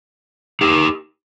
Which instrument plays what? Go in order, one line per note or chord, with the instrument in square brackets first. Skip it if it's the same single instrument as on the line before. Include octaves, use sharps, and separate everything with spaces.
[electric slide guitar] D#4 G4